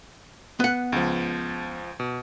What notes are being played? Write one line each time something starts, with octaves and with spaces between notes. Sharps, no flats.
B3 F#5
C#2 F3
B2